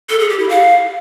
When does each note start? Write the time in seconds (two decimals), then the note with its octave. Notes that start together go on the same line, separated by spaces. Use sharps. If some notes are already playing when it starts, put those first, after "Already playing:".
0.09 A4
0.19 G#4
0.29 G4
0.39 E4
0.49 F5